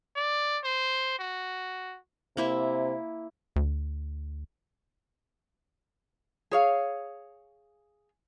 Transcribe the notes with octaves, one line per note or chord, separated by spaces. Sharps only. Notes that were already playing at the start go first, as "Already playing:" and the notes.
D5
C5
F#4
C3 A#3 E4 E5
D2
G#4 C#5 F5